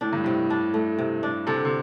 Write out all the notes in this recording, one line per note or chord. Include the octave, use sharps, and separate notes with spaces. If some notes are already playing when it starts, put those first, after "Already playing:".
A2 D4
G2
A2 C3
D4
A3
C3
D4
C3 A4
D3
C3